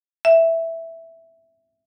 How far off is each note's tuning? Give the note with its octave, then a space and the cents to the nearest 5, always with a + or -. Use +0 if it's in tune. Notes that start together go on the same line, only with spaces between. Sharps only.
E5 +0